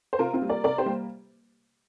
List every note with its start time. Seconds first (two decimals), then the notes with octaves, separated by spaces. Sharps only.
0.13 C5
0.19 C3 F4 A#4
0.34 C4 F4
0.42 G3 A#3
0.49 A#4 D5
0.64 C3 A#4 D5
0.78 G4 C5
0.86 G3 A#3